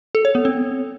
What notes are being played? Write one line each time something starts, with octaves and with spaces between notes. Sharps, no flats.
A4
C#5
B3
C4